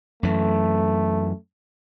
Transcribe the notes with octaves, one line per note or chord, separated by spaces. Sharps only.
F#2 E3 A3